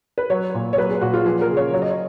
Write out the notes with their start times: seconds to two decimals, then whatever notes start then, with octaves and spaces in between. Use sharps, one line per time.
0.18 B4
0.30 F#3 C#5
0.54 A#2
0.73 C#5
0.78 F#3 B4
0.90 G#4
1.01 A#2 F#4
1.14 F4
1.25 F3 G#4
1.41 A#4
1.49 C#3
1.57 C#5
1.73 F#3 C#5
1.82 D#5
1.90 C#5